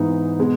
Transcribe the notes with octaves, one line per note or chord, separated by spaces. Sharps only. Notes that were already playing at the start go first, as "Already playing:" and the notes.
Already playing: G#2 E3 B3 D#4
B2 G#3